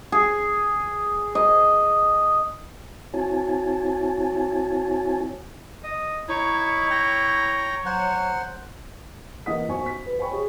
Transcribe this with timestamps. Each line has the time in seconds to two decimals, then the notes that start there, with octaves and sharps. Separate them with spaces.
0.12 G#4
1.35 D#5
3.14 C4 E4 F#4 C#5 G#5 A5
5.84 D#5
6.29 D#4 E4 C#5
6.90 G5 A#5
7.86 F#3 C5 F#5
9.46 E3 A#3 D#5 F#5 D#6 B6
9.68 B1 D#4 C5 G#5 C#6
9.86 B6
10.06 B4
10.19 C5 G5 G#5 B5 C#6
10.31 G#4 C#5